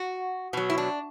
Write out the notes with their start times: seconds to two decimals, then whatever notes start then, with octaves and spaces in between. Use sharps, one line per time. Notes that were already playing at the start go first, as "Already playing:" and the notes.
Already playing: F#4
0.53 B2 F#3
0.70 E4
0.78 D4